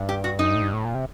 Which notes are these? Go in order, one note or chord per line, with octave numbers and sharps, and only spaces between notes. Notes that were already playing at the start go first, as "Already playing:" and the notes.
Already playing: G2
G4
F#4
F#2 D#4
G2
A2
G2
A2
A#2
C3